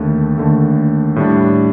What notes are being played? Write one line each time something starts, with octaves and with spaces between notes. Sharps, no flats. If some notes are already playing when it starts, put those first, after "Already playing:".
Already playing: D#2 D3 A3
D#2 D3 A3
A2 G3 D4